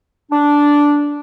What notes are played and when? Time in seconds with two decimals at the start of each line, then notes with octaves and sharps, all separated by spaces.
0.31 D4